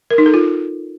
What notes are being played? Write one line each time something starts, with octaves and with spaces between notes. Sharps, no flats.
A#4
D#4
A4
F4